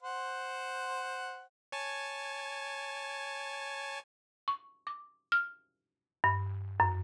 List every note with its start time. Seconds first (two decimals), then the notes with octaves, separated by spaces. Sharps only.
0.03 C5 F#5
1.72 C#5 G#5 A5
4.48 C#6
4.87 D6
5.32 F6
6.24 G2
6.80 F#2